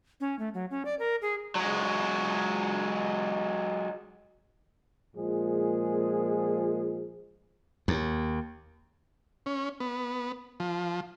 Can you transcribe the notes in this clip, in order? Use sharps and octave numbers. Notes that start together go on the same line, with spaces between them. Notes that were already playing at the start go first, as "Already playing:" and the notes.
C#4
A3
F#3
C#4
D5
A#4
G#4
F#3 G#3
A#2 F3 G#3 G#4
D#2
C#4
B3
F3